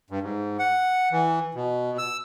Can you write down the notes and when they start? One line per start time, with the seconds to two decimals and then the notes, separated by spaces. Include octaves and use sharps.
0.10 G2
0.22 G#2
0.59 F#5
1.12 E3
1.55 B2
1.98 E6